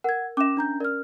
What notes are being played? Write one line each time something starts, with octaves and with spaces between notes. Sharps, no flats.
A#4 F#5 G#6
C#4 E5 D6 E7
D4 A#5 G6
A#4 D5 F6